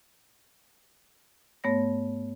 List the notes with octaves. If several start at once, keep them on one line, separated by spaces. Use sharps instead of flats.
G#2 A3 B3 C#5 A#6